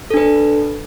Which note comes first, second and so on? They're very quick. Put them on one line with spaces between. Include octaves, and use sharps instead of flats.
A4 D4 B4